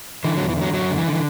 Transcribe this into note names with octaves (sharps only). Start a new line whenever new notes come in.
D3 E3
F#3
E2
E3
D3 F#3
F#2 F#3
D3
E3
D3
E3